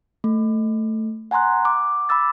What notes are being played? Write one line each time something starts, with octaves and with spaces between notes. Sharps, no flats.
A3
F#5 G#5 A#5 C6 F#6
D6
B5 D6 E6 A6